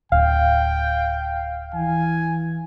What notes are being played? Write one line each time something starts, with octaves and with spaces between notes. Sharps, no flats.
D1 F5 G5
E3 G#5